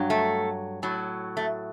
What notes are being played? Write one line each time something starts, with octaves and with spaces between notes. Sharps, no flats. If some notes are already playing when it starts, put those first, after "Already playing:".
Already playing: G2 F#3
A3
A2 F#3
A3